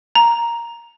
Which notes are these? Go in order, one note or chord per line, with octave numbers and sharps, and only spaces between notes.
A#5